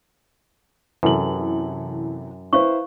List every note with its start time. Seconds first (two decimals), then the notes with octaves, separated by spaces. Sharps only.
1.03 F#2 C3 E3 A4 B4 F#7
2.53 E4 B4 C5 F5 C#6